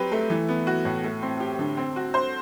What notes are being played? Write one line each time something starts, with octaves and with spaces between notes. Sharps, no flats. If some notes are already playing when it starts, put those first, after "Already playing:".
Already playing: F#3 C4 G4 B4
A3
E3
B3
F#4
A2
A3
C4
G4
D3
C4
F#4
C5